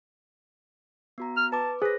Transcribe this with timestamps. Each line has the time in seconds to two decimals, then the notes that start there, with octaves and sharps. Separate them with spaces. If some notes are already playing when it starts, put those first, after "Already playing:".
1.18 B3 F#4 A#5
1.37 F6
1.52 B4 A5 D6
1.82 G#4 B4 C5 A#6